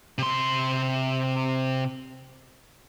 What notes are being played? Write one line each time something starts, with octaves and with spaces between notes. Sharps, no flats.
C3 C6